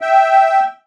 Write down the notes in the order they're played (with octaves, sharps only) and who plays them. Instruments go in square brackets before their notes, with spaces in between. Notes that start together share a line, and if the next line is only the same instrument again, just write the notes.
[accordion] E5 G5